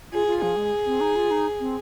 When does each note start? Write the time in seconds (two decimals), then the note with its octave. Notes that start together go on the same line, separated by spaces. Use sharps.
0.12 F4 G#4
0.27 F4
0.42 F3 G#4
0.56 G#3
0.86 C4
1.01 D#4
1.16 F4
1.31 D#4
1.60 C4